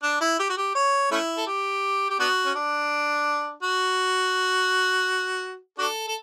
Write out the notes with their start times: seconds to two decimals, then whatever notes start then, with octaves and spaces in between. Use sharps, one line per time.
0.03 D4
0.21 E4
0.39 G4
0.49 F#4
0.57 G4
0.75 C#5
1.11 A3 C#4 E4
1.37 A4
1.47 G4
2.10 G4
2.19 B3 D4 F#4
2.46 C#4
2.55 D4
3.63 F#4
5.78 D4 F#4 A4
6.08 A4